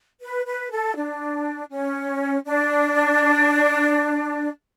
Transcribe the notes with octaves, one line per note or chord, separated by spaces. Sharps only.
B4
B4
A4
D4
C#4
D4